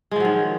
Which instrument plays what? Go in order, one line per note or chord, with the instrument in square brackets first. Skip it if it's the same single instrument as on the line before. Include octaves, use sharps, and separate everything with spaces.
[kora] G#3
F3
F#3
D#3